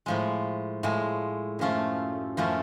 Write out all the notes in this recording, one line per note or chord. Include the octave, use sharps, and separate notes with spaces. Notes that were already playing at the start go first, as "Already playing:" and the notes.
A2 F3 G#3
A2 F3 G#3
F#2 F3 A3 C#4 F4
F#2 F3 A3 C#4 F4